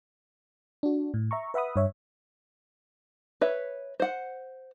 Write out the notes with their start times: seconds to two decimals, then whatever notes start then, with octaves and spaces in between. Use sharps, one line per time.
0.83 D4 F#4
1.14 A2
1.31 E5 A#5 C#6
1.54 B4 E5 F#5 B5 D#6
1.76 G2 C#5 E5
3.41 B4 C#5 E5
4.00 C5 F#5